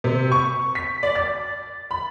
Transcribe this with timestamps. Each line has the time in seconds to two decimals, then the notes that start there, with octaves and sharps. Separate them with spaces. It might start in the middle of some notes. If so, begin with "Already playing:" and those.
0.04 C3
0.32 C#6
0.75 B6
1.03 D5
1.15 A6
1.91 B5